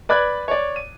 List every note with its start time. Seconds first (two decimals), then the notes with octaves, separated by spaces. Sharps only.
0.09 B4 D5 B5 F#6 G#6
0.48 C#5 D5
0.76 D#7